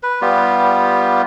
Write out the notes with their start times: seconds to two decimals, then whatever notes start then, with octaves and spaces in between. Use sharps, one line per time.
0.03 B4
0.22 G3 B3 F4 G4